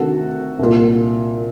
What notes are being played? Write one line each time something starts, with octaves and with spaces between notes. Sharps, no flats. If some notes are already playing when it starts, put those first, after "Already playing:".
Already playing: D2 C3 D#3 F#4 A4
C2 A#2